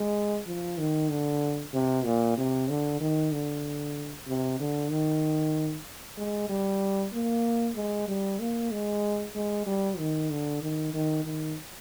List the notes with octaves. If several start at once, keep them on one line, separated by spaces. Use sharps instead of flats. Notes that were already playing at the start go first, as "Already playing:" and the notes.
Already playing: G#3
F3
D#3
D3
C3
A#2
C3
D3
D#3
D3
C3
D3
D#3
G#3
G3
A#3
G#3
G3
A#3
G#3
G#3
G3
D#3
D3
D#3
D#3
D#3